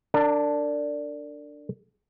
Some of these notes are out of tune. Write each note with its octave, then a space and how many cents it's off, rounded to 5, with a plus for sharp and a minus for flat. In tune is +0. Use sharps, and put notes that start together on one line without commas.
D4 +0 A#4 -45